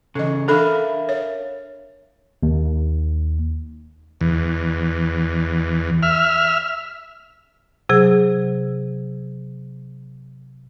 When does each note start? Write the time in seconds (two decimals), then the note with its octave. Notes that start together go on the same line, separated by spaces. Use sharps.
0.15 C#3 E3 A4 D#5
0.48 D4 A4 A#4 E5 F5 B5
1.09 C#5
2.43 D#2
4.21 E2
6.03 E5 F6
7.89 C3 F#3 G#4